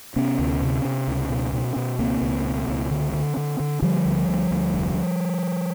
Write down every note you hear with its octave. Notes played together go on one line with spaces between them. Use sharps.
C3 B3 C#4
D2
C3
C3
C#2
B2
B2
B2
C#2 A#3 C4
C#2
B2
C#2
D3
D3
D3
D3
D3 F3 G3
D2
D2
D2
F1